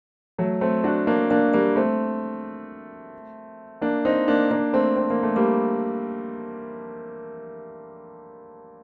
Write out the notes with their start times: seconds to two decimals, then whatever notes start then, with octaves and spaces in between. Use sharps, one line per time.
0.38 F#3 A3
0.61 A3 C4
0.84 D4 F#4
1.07 A#3 D4
1.31 A#3 D4
1.53 G3 A#3
1.76 A3 C4
3.82 A#3 D4
4.05 C4 D#4
4.28 A#3 D4
4.51 A#3 D4
4.73 A3 C4
4.96 C4
5.10 A#3
5.23 A3
5.36 G3 A#3